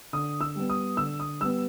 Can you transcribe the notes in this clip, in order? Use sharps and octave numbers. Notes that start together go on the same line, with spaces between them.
D3 D#6
E6
G3 B3
D#6
D3 E6
D#6
G3 B3 E6